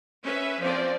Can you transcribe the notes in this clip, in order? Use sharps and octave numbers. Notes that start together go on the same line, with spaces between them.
C#4 B4 E5
F3 C4 D5